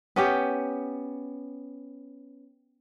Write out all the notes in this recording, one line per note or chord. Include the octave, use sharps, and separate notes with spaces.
B3 C#4 G4